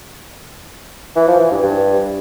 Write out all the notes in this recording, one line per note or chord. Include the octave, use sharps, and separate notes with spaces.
E3
F3
E3
G2
G2